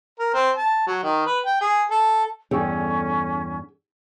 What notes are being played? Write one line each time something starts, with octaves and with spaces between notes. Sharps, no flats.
A#4
C4
A5
F#3
D#3
B4
G5
G#4
A4
E2 G2 C#4 G#4 A4 G5